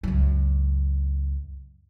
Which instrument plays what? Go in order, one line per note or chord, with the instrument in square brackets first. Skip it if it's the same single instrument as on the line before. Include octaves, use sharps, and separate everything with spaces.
[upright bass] C#2 F#2